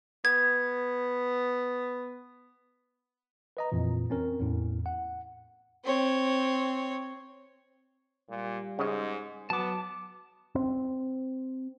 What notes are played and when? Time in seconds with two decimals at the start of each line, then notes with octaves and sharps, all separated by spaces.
0.25 B3 G#6
3.57 B4 D#5 A#5
3.72 F2 A#2 E3
4.10 C4 C#4 A#4
4.40 E2 A2
4.86 F#5
5.84 C4 C#5
8.30 A#2 G3
8.79 G#2 C#3 D#5
9.50 F#3 B3 A5 D6
10.55 C4